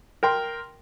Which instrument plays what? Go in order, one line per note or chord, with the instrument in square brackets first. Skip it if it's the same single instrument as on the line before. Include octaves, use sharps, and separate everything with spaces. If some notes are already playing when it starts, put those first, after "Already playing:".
[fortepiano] A#4 G5 C6